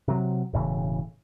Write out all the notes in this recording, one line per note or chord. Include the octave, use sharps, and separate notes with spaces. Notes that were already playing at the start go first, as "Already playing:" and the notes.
C3 F#3
E1 A2 C#3 E3